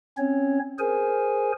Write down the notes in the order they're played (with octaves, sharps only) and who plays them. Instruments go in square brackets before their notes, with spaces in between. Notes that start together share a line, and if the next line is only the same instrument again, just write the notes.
[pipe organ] C4 C#4 C#5
G#4 A#4 C5 G#5